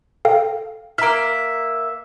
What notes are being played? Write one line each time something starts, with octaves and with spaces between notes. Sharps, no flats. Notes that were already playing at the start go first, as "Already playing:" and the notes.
A4 F5 G5
A#3 E5 A#5 F6